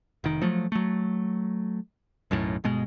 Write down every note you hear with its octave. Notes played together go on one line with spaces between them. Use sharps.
F1 D#3
F3 F#3 A3
F#3 A3
B1 F#2 A2
G1 B2 G#3